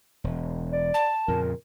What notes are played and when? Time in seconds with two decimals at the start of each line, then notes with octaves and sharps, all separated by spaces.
0.24 E1
0.72 D5
0.94 A5
1.28 F2 A#2 C#3 A#4